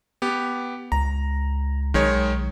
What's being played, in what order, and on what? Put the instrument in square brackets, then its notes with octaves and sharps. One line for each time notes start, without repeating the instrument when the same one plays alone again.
[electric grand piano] B3 G4
[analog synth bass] C#2 [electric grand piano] A#5
[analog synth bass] B1 [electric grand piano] D#3 G#3 C#5